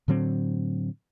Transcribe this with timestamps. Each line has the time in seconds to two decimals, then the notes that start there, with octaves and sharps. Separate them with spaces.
0.08 A2 D3 F#3 C4